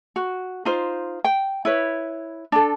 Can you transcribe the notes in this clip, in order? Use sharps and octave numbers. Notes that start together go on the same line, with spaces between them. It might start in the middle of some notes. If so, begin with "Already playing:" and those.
F#4
D#4 F4 C5
G5
E4 B4 C#5
D4 A4